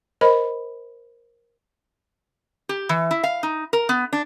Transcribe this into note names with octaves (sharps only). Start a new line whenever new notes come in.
A#4 C5 D#5 B5
G4
E3
E4
F5
D#4
A#4
B3
D4